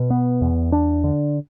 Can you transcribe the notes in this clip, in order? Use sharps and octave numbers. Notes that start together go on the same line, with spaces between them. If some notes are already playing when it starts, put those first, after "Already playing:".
Already playing: B2
B3
E2
D4
D3